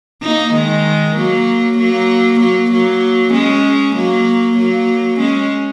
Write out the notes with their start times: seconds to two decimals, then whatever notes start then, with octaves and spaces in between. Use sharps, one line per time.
0.23 A#3 D#4
0.54 D#3 G#3
1.17 F#3 A#3
1.78 F#3 A#3
2.40 F#3 A#3
2.71 F#3 A#3
3.33 G#3 C#4
3.96 F#3 A#3
4.58 F#3 A#3
5.20 G#3 C#4